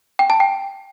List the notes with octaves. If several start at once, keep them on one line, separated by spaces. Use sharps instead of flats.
G5
A5
G5